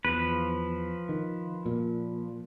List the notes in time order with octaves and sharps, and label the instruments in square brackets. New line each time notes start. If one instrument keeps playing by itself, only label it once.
[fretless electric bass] E2 [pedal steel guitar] F3 B4
[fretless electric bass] D#3
A#2